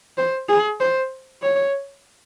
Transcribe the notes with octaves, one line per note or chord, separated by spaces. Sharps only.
C5
G#4
C5
C#5